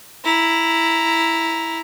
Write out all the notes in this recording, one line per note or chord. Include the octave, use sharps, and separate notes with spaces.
E4 A#5